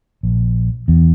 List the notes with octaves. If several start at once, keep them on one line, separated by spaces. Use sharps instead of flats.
A#1
E2